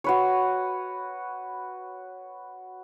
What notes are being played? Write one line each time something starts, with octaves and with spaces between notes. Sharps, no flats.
F#4 B4 C#5